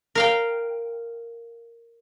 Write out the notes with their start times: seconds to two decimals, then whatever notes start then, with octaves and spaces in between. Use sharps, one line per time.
0.15 A#4 F5 G5